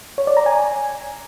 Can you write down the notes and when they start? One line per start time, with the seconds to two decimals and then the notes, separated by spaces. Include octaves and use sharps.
0.18 C#5
0.27 D5
0.37 A#5
0.46 G#5